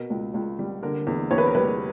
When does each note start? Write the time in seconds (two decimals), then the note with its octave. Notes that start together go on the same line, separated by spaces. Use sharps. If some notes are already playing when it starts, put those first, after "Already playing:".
Already playing: B2 A#4
0.10 C#2
0.34 C#2
0.59 G3
0.83 D3 A#4
1.07 E2
1.31 E2 C#5
1.38 B4
1.46 A#4
1.55 G3 B4